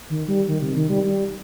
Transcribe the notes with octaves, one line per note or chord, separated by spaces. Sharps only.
D#3
G3
D#3
C3
D#3
G3
G3